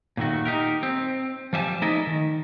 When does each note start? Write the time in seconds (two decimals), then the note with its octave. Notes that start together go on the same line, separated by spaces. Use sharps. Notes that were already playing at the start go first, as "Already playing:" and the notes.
0.17 A#2 D#3 A3 F#4
0.45 D#4 G4 A#4
0.83 C4
1.53 F3 G3 E5 G#5 A5
1.82 A3 D#4 E4 G#4 D5 D#5
2.07 D#3